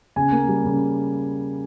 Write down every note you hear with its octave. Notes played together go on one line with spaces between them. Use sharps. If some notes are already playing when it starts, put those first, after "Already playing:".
C#3 G#5
A#3
G3
C#3